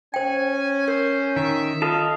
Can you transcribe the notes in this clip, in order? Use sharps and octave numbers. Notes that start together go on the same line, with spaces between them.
C#4 C5 G5 G#5
A#4 C5
D#3 E5
F4 A4 D#5 F5 A5